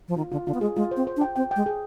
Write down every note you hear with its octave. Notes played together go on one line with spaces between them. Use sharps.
F3
D#3 F4
D3 F4
D3 F4
B3
G#3 G#4
G#3 F4
C5
C4
C5
D4
G5
C4 G5
G#3 G5
G#4